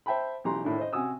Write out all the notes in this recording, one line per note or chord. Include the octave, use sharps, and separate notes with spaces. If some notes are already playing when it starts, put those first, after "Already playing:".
C5 E5 G5 A5 B5
B1 E3 G4 A#5 C6
A2 D#3 D4 E4
C5 D#5
C3 F#4 G#5 D#6 E6